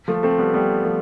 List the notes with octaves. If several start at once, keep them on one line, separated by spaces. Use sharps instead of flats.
F3 A3
A3 C4
G3 B3
G3 B3
F3 A3